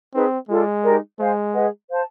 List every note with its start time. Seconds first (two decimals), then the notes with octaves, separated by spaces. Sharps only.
0.14 C4 D#4 G#4 B4
0.49 G#3 F4 A4 D5
0.83 D#4 G4 A#4 D5
1.19 G#3 C5 F5 G#5
1.54 G#4 B4 D#5 F#5
1.89 C5 F5 A5